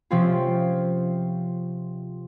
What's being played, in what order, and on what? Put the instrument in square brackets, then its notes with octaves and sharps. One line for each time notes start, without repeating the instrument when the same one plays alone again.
[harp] C3 F3 C4 C#4 F4